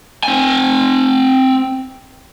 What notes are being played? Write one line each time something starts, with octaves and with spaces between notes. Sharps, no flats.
C4 G#5